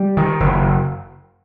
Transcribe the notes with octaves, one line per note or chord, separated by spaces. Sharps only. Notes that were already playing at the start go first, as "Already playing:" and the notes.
Already playing: G3
D#3
F#1